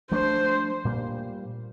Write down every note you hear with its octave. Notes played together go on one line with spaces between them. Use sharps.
F3 A3 D4 C5
A#2 G3 A#3